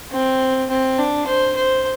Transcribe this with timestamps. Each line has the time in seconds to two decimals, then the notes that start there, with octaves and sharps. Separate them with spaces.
0.12 C4
0.70 C4
0.99 D4
1.27 C5
1.56 C5